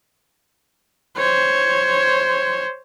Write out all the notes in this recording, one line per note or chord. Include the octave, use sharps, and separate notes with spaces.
C5 C#5